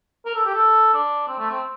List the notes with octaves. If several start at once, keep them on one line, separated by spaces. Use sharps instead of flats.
A#4
A4
G4
A4
D4
C4
A3
C4